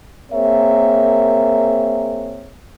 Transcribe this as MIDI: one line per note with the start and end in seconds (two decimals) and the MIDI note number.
0.31 2.52 58
0.31 2.52 60
0.31 2.52 68
0.31 2.52 70
0.31 2.52 73
0.31 2.52 76